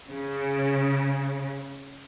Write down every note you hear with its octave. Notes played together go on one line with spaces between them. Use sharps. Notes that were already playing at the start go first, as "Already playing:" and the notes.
C#3